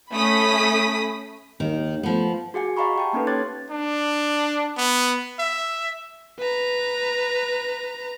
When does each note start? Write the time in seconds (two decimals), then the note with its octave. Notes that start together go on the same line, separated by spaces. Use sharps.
0.13 A3 C#4 B5 D#6 B6
1.60 D#2 D#3
2.03 F3 A3 B3
2.54 F#4 G#4 F#5 G#5
2.77 D#5 F5 F#5 A#5 B5 C#6
2.96 G4 G5 A5
3.13 A#3 C#4 D#4 A4 B4
3.27 C#5 C6 D6 F#6 G#6 A6
3.70 D4
4.77 B3
5.39 E5
6.39 B4 A#5